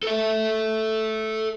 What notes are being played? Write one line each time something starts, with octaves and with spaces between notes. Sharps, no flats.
A4 E5